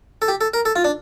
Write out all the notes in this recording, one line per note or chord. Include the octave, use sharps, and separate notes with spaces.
A4
G4
A4
A#4
A4
F4
D4